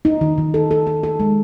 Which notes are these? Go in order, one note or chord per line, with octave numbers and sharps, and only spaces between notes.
D#4
D#3
D#3
A4
A4
A4
A4
G#3